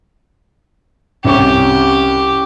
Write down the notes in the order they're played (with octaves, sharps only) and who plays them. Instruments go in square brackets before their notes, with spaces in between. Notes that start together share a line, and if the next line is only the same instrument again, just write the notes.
[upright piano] C2 C#4 C#6 [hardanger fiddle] G4